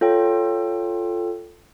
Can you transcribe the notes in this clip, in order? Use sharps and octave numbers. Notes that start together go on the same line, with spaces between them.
F4 A4 C#5 G5